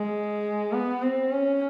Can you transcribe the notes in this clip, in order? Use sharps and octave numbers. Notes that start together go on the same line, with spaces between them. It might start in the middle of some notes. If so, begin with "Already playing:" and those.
Already playing: G#3
B3
C4
C#4